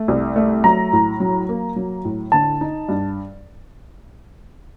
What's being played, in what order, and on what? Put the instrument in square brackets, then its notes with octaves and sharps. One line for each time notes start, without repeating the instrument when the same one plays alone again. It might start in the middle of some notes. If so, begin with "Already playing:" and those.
Already playing: [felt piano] A3
C2
A3
[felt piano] F#3 [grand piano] A#5
[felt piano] A2
F#3
A#3
F#3
A2
[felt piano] D3 [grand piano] A5
[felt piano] D#4
G2